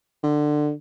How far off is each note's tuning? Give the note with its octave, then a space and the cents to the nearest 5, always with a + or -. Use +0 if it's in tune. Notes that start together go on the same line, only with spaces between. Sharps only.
D3 +20